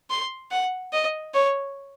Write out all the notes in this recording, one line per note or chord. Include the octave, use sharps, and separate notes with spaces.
C6
F#5
D#5
C#5